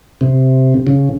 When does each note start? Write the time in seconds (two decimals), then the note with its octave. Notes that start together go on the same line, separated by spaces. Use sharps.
0.21 C3
0.87 C#3